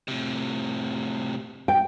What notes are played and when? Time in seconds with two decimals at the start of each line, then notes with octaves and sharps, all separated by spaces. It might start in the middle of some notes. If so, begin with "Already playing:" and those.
0.08 A2 C3
1.68 G5